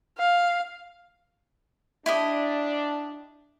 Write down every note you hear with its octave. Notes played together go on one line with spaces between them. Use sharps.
F5
D4 E4 G4 D#5